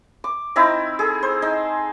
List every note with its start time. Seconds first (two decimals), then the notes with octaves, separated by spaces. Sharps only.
0.24 D6
0.56 C4 D#4 E4
0.99 G#4 A4
1.23 C5
1.42 D#4